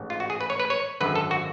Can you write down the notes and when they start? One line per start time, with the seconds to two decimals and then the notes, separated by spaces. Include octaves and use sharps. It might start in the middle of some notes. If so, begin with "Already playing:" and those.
Already playing: A1 G#2
0.10 F4
0.20 F#4
0.30 G#4
0.41 B4
0.50 C#5
0.60 B4
0.70 C#5
1.00 G#1 F#2 D3 B4
1.16 A4
1.31 F#4